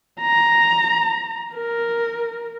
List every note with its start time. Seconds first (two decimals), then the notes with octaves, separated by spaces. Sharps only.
0.22 A#5
1.54 A#4